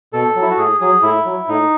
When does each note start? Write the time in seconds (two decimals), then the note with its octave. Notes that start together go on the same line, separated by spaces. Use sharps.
0.13 B2 A4
0.35 F#3
0.42 E4
0.51 F#4
0.57 A2 G#4
0.81 F#3 G#4
1.03 A2 E4
1.25 F#3
1.48 A2 D#4